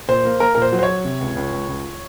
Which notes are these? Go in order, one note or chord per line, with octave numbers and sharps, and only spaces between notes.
A#2 C5
A#3
A#3 A#4
A#2 A#4
C5
F#3
C5
C#5
F#3
C3
C#2
C#2
C#2
C#2